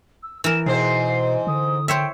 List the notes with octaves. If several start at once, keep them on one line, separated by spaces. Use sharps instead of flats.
E6
E3 A#4 E7
G#2 B2 C4 C5 C7
D3 D#6
C5 C#5 E5 G5